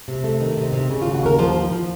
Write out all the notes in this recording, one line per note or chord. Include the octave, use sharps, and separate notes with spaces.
C3
A3
D#3
C3
C3
C#3
F4
D#2
F#4
D#2 A#4
F3 C5
F3
F3